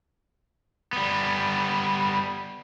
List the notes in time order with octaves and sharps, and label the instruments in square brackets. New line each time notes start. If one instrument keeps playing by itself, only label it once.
[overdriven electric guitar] G3 B3